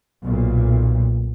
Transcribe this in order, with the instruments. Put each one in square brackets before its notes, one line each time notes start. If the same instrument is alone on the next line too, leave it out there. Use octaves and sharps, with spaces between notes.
[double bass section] B1 A#2